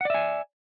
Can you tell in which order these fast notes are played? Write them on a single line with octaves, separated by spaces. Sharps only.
F#5 D5 E5 G#5